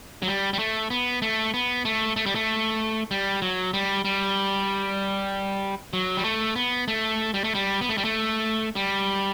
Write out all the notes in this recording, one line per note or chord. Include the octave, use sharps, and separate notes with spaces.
F#3
G3
G3
A3
B3
A3
B3
A3
A3
G3
A3
G3
F#3
G3
G3
F#3
G3
A3
B3
A3
G3
A3
G3
B3
A3
G3
A3
G3